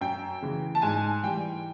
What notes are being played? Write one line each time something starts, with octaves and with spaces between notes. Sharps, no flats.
F#2 G5
C#3 E3
A5
G#2 G#5
E3 G3 G5